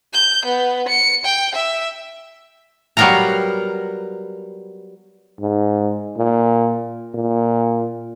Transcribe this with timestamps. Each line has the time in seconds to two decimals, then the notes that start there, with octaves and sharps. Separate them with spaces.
0.13 G6
0.45 B3
0.88 C#7
1.24 G5
1.54 E5
2.97 F#3 G3 B3 A#4 F5 A#5
5.40 G#2
6.18 A#2
7.14 A#2